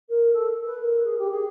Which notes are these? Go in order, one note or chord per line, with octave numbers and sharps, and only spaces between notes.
A#4
A4
B4
A#4
G#4
G4
G#4